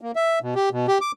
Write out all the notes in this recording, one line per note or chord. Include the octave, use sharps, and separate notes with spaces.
A#3
E5
B2
G4
B2
G4
D6